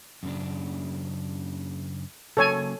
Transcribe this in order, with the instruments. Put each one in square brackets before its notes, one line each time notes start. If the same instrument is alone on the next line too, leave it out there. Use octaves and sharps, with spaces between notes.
[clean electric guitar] F#2 C#3 D4
[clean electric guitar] C#3 F#3 A#3 [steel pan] A4 C#5 G#5